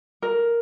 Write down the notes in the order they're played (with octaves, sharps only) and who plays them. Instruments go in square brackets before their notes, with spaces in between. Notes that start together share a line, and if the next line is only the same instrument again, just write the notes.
[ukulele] A#4